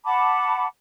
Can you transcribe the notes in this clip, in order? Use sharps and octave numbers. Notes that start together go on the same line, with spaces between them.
F#5 A5 B5 D6